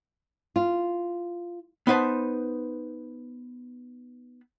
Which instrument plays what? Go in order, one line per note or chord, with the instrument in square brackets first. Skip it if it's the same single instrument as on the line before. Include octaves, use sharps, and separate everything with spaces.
[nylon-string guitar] F4
[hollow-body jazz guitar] B3 D#4 B4 C5 A5